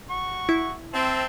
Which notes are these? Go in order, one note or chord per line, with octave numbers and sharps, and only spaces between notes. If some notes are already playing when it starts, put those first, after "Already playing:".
F#4 C#6
E4
C4 E5 A5